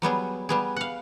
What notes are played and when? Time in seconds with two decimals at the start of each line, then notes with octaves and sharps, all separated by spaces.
0.02 F#3 G3 B3 G#4
0.49 G3 B3 G#4
0.76 F5 F#5